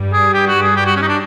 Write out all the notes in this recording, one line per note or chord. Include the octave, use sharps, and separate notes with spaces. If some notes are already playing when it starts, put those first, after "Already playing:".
Already playing: G2 G3
G#4
G4
F#4
G#4
G4
F#4
C#4
D#4
D4